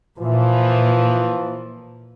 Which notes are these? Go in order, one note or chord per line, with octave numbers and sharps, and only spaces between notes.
A#2 E3 F3